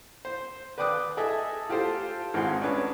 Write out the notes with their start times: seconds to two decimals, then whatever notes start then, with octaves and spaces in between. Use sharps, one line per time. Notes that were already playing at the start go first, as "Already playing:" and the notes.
0.25 C5
0.78 B4 D5 G5 D6 D#6 F#6
1.17 G#4 A4 D#5 E5
1.69 F4 G4 A4 C5 F5
2.34 G#1 C4 G#4 F#5 C6
2.61 C#4 D4 G#4 B4 C#5